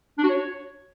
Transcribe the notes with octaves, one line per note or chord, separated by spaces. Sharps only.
D4
F#4
C#5